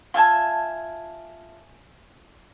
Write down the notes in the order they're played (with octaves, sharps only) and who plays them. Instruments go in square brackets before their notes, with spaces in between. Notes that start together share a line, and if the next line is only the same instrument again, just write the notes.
[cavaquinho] F4 E5 G#5 A5